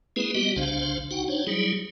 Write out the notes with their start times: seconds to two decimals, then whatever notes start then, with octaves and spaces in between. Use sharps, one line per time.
0.16 G#3 A#3 C4 E4 G#4 B4
0.35 G3 B3 F#4 G4 D#5
0.56 C2 C#3 D4 C5 F5
1.11 D#4 F#4 F#5 G5
1.28 D4 D#4 C5 C#5
1.47 F#3 G3 E4 G#4